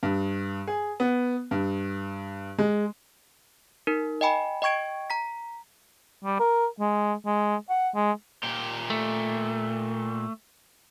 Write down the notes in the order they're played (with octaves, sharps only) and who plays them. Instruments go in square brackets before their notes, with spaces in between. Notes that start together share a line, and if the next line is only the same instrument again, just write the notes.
[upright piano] G2
G#4
B3
G2
G#3
[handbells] D#4 A#4
D#5 G5 G#5 B5
D#5 G5 C#6 G#6 D7
A#5 B6
[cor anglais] G3
A#4
G#3
G#3
F#5
G#3
[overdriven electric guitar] A#2 G4
[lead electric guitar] A3